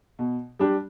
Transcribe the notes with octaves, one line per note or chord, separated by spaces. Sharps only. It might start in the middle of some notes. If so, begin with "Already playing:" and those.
B2
G3 D4 G4